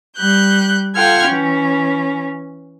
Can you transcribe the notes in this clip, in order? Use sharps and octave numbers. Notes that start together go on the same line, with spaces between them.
G3 F#6 G6
F4 A4 F#5 G5 F6 G#6
E3 C#4